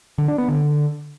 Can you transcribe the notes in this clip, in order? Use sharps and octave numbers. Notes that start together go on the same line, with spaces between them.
D3
D4
B3
D3